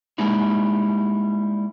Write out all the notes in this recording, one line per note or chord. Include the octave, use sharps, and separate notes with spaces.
G3 G#3 A#3 D#4 E4